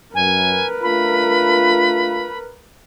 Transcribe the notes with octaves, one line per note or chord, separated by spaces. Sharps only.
F#2 A#4 B4 G#5
A3 D4 F4 B5